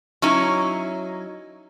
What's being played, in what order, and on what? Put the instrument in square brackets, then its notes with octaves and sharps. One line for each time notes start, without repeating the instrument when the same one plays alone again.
[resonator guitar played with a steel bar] F#3 C#4 D#4 E4